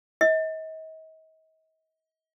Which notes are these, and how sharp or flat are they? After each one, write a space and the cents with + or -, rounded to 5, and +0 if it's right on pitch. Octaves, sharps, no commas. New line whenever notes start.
D#5 +40